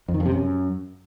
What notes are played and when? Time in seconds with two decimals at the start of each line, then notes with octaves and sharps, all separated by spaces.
0.08 F2
0.14 D#3
0.20 F2
0.26 C3
0.31 F#2